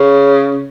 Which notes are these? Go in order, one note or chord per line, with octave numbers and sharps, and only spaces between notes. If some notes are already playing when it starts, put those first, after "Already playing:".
Already playing: C#3